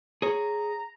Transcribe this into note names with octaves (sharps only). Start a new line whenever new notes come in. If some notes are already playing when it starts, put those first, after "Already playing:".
G#4 C#5 A#5